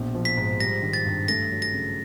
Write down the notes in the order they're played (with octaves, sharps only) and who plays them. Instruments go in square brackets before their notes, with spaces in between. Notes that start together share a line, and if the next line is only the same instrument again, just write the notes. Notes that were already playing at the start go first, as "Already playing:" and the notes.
Already playing: [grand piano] A#1 B2
F3
[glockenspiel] B6
[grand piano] G#2
[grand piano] G3 [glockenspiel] A#6
[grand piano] D#3
[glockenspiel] A6
[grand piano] G2
[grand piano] A3 [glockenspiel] A#6
[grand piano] F#3
[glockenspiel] A#6
[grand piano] C#3